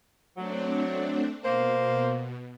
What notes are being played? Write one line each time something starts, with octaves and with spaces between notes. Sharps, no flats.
F#3 A3 C4 D4
B2 A#3 C5